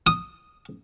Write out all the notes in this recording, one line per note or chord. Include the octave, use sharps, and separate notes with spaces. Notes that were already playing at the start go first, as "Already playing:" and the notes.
D#6